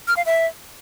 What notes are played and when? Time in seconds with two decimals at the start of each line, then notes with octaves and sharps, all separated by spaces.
0.07 F6
0.17 F5
0.26 E5